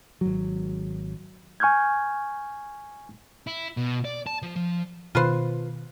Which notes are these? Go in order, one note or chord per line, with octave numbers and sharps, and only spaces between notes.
G#1 F#3
G#5 C#6 F6 G6 G#6
E4
B2
D5
A5
F3
F3
B2 D#3 F4 B4 C5